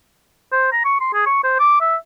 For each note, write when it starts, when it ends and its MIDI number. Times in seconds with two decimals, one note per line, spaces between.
0.52 0.69 72
0.72 0.81 82
0.85 1.00 85
1.01 1.11 84
1.14 1.25 68
1.26 1.42 85
1.44 1.58 72
1.59 1.80 86
1.81 1.96 76